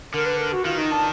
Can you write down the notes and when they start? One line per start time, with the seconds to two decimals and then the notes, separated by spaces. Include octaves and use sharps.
0.14 D3 A#4
0.26 B4
0.39 A#4
0.52 F#4
0.65 D#3 F4
0.78 D#4
0.91 D4